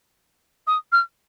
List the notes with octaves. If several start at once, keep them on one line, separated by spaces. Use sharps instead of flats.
D#6
F6